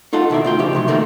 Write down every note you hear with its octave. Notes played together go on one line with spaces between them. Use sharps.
D#4 F4 A4 F#5
B2 D#3 E4 D5 E5
D2 F4 G5
C#3 F3 D#4 G4
A2 C3 F#3
G#2 C3 D#3 E3 A3 A#3